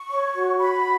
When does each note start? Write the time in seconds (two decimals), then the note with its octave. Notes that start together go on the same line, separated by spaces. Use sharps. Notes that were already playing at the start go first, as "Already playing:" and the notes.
Already playing: C#6
0.11 C#5
0.36 F#4
0.59 F#4 B5